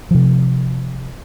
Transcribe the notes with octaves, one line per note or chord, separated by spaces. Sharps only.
C3 F3